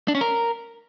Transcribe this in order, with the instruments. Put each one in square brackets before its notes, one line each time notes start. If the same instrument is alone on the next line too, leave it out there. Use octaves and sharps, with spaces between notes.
[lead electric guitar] D4
C#4
A#4